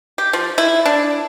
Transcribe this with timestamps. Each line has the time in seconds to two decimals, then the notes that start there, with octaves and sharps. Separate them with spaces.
0.18 G4
0.33 F3
0.58 E4
0.85 D4